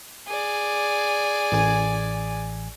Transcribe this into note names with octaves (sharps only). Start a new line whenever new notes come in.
G#4 D5
A1 G#5